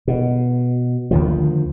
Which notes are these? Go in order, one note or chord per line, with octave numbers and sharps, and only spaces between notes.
B2
D2 D#3 F3